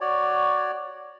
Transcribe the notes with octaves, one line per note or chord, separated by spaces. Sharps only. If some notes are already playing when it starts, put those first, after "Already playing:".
F#4 C#5 D5